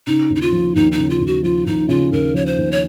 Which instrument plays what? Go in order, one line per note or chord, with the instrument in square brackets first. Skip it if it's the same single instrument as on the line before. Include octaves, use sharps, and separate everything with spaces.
[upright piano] C#3 [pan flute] D#4
[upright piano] D#2
[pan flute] D#4
F4
[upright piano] F3
[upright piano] D#2 [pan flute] D#4
[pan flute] D#4
[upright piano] C#3
[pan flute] F4
[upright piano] D#2
[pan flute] F#4
[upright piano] F3 [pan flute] F4
[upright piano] D#2 [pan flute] D#4
[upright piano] C#3 [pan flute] F4
[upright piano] D#2 [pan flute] A#4
[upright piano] F3 [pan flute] C#5
[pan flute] C5
[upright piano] D#2
[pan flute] C#5